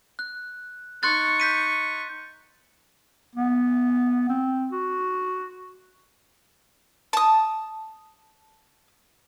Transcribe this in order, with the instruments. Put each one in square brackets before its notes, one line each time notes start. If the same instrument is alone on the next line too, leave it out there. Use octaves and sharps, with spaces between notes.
[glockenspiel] F#6
[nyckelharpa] D#4 C#6 [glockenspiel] C6 F#6 A6
[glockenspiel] G6 B6 D#7
[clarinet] B3
C4
F#4
[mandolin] A5 D#6